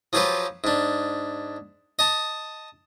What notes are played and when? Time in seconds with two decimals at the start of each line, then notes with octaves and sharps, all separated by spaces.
0.13 F3 F#3 F4 G4 B4
0.64 G#2 D4
1.99 D#5 A5